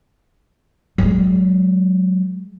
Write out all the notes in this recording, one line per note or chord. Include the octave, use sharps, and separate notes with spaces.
F#3 G#3